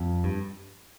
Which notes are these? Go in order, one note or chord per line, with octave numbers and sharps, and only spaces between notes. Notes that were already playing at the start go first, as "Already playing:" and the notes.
Already playing: F2
G2